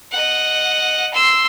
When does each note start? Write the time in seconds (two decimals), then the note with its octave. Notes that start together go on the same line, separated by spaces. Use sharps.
0.12 D#5 F#5
1.14 C6 E6